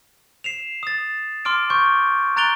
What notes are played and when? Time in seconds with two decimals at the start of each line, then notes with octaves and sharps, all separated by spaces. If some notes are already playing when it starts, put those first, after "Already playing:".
0.44 C7 E7 F7
0.83 D#6 A6
1.45 C6 D6 F6 D7
1.70 C6 C#6 G6
2.36 A#5 F#6 A6 D7 F7 G7